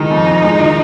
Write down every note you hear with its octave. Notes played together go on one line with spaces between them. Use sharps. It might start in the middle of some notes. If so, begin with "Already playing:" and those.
Already playing: D#3 G#3 D#4
F2
F2
G#3
D#3